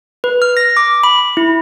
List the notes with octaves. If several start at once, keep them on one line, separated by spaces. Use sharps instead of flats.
B4
F6
A#6
D6
B5
E4